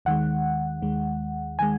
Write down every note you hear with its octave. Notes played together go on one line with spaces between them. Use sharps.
D#2 D#3 G#3 F#5
D#2 D#3 G#3
D#3 G#3 G#5